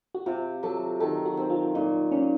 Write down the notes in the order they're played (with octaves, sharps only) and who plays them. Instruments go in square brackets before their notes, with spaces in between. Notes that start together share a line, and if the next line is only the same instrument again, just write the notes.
[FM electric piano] F#4
[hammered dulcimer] C3 [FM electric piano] F4
[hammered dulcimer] F#3 [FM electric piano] A4
[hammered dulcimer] D#3 [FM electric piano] A4
[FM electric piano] F#4
[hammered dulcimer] C4
[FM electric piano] F4
[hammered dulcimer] A#2 [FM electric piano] D#4
[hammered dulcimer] A#2 [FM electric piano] C#4